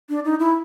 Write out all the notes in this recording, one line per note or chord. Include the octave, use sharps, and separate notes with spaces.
D4
D#4
E4